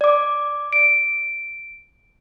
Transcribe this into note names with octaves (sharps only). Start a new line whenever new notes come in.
D5 D6
D7